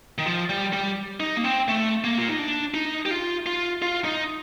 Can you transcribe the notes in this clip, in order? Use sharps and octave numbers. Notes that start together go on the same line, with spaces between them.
D#3
F3
G3
G3
D#4
A#3
C4
A3
A#3
F4
D#4
D4
D#4
G4
F4
F4
F4
D#4